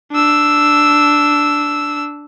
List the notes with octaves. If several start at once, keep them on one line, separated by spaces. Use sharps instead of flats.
D4 E6